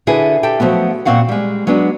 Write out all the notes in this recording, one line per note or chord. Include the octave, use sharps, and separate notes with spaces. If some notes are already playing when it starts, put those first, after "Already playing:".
D3 E4 G#4 A4 B4
G4 A4 G5
F3 F#3 A3 B3
A#2 C4 F#4 F5 F#5
G3 G#3
F#3 G#3 B3 D4